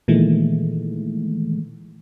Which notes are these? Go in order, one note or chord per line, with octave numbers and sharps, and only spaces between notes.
A#2 D#3 E3 G#3 A3